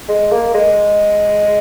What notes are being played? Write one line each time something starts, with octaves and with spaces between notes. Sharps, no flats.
G#3
A#3
G#3